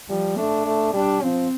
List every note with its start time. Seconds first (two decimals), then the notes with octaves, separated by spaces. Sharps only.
0.09 F3 G3
0.37 A3 D4
0.66 A3
0.94 G3 D4
1.22 F3 C4